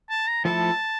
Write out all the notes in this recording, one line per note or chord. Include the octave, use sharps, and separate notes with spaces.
A5
A#5
F3 A3 E4 A4 A5